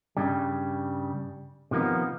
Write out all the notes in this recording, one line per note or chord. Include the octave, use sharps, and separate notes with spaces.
G2 C#3 G3
C3 D#3 F3 A#3 B3